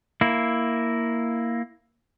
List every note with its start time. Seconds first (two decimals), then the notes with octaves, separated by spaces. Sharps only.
0.21 A#3 E4